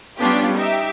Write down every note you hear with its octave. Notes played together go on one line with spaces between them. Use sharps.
G3 B3 C#4 D4 F4 G4
D#4 G4 E5